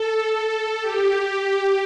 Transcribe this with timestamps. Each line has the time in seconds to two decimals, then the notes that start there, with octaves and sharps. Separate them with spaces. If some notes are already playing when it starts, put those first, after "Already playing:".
Already playing: A4
0.82 G4